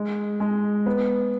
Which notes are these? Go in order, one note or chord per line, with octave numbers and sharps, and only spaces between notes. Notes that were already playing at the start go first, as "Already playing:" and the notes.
Already playing: G#3
G#3
B3